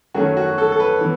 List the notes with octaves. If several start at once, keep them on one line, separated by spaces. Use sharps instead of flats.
F#2 D#3 F#3 A3 C#4 F#4
F#4
A4
A4
B4
E3 B3